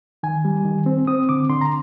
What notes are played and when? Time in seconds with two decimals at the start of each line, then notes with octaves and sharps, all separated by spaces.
0.23 D#3 G#5
0.45 G3
0.65 D#3
0.86 C4
1.07 C4 D#6
1.29 D3 D6
1.49 D3 C6
1.61 A#5